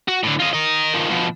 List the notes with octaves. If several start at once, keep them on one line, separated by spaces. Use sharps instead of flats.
F#4
A2 D3
F4 D#5
A#4 D#5
D#3 F3
B2 F3